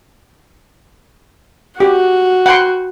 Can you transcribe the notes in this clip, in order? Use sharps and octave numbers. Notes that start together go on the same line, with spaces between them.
F#4 G4
F#5 G5 C6